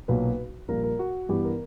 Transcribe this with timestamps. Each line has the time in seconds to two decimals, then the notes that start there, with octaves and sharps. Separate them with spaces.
0.08 B1 A#2 F#3 A#3 B4
0.68 A#1 A#2 G3 A#4
0.84 A#4
0.99 F#4
1.29 G2 E3 B3 G4
1.44 A#4